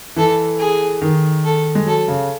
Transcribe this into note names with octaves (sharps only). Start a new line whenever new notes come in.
E3 A4
G#4
D#3
A4
G#3
F#3 A4
C#3